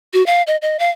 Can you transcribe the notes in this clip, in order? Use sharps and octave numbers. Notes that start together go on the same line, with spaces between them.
F#4
F5
D#5
D#5
F5